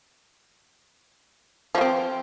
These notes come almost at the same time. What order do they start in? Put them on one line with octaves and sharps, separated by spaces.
F3 F#4 C4